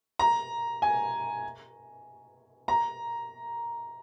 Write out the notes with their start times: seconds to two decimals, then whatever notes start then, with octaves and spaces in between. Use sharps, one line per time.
0.19 A#5
0.82 G#5
2.68 A#5